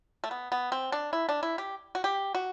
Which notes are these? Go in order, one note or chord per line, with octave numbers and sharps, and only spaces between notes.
A3
B3
B3
C4
D4
E4
D4
E4
G4
F#4
G4
F#4